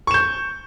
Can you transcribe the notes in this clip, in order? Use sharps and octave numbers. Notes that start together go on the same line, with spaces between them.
C#6 G6 E7